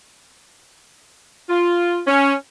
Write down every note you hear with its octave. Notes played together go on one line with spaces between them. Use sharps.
F4
C#4